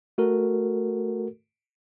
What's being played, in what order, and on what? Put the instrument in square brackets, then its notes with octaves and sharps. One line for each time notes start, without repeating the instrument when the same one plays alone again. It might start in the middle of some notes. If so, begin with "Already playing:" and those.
[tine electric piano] A3 F#4 A4 A#4